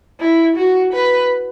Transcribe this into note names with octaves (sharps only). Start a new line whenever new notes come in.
E4
F#4
B4